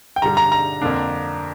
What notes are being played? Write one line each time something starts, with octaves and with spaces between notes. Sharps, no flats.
G5
G2 D3 G3 A#5
A#5
A#5
F2 D3 A#3 D4